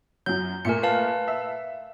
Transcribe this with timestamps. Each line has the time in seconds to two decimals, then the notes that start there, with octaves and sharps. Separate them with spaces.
0.26 F#2 F#3 G6
0.65 A#2 A3 A#4 G#5 C#7
0.83 B4 F5 A5
1.28 E5